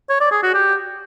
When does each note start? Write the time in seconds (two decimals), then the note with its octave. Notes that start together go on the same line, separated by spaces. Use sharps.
0.09 C#5
0.21 D5
0.32 G#4
0.43 F#4
0.54 G4